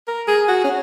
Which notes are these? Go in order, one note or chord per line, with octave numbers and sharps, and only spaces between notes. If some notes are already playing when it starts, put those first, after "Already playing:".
A#4
G#4
F#4
C#4